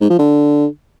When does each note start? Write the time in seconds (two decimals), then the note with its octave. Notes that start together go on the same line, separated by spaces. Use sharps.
0.01 G#2
0.10 F3
0.19 D3